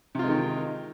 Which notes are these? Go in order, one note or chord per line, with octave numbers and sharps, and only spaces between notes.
C3 D#3 G#3 F4